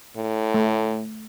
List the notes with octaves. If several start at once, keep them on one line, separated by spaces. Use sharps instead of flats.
A2
A3